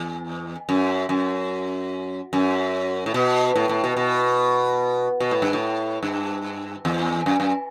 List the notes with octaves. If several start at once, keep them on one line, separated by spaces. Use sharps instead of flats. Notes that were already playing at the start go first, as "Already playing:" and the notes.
Already playing: E2
F#2
F#2
F#2
A2
B2
A2
A2
B2
B2
B2
A2
G2
A2
G2
E2
F#2
F#2